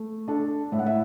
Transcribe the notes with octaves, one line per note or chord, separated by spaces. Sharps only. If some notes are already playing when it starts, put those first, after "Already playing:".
Already playing: A3
D4 A4 A5
A2 E5
F#5
E4 E5